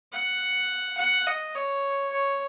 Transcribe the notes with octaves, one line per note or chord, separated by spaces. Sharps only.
F#5
F#5
D#5
C#5
C#5